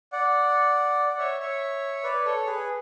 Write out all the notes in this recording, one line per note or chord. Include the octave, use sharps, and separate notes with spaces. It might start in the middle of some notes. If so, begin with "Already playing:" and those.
D5 F#5
D5
C#5 E5
C#5 E5
B4 D5
A4 C#5
G#4 B4